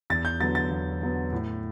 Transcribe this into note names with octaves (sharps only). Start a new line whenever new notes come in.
E2 A6
G6
D3 F#3 B3 A6
A6
E2
D3 F#3 B3
A2